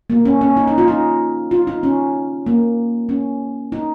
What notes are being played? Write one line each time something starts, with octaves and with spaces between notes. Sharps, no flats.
A#3
C#4
C#4
D#4
D#4
F4
D#4
F4
D#4
C#4
A#3
C#4
D#4